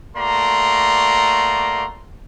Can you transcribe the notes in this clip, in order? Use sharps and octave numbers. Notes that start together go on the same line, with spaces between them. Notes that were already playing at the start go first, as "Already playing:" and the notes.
A3 A#3 F#4 D5 A#5 C6